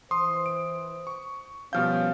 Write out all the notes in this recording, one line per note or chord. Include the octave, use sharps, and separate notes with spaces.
E3 C5 C6 D#6
D7
C#6
B2 F3 G3 C#4 G4 F5 F6 G6